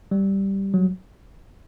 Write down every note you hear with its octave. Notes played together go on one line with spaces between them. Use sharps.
G3
F#3